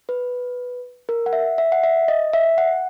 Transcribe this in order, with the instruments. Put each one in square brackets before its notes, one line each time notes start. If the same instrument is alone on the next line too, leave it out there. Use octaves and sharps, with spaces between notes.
[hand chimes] B4
A#4
F#5
E5
E5
F#5
E5
D#5
E5
F#5